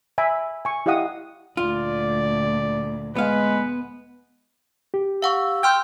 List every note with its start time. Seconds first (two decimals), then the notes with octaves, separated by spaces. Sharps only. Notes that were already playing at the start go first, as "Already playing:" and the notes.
0.18 E5 G#5 B5
0.65 G#5 C#6
0.86 E4 G4 D#5 F5 F#5 D#6
1.57 D2 A#2 F4 D5
3.16 G#3 B3 B4 F5
4.94 G4
5.22 F5 F#5 C#6 E6
5.63 G5 C6 F6 G6